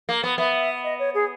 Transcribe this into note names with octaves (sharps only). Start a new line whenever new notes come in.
A#3
B3
B3 E5
D#5
C#5
G#4